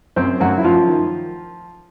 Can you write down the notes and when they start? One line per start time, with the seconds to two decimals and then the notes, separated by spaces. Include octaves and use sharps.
0.16 F#2 C4 C5
0.40 F#2 F#3 F#4
0.58 E4
0.64 F#2 F3 F4
0.88 D#3